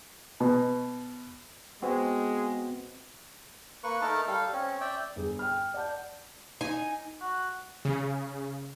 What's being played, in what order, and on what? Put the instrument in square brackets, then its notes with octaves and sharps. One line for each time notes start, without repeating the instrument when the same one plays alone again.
[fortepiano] B2
[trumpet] G#3 [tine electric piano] B3 C4 F#4
[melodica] A#3 B4 C#6
A3 D#4 A#4 A5
G3 A4 F5
C4 C#4
D5 E5 G5
[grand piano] G1 G#4
G5 F6
D5 F#5 A5 G6
[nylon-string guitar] D#4 [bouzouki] G#5
[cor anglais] F#4
[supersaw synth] C#3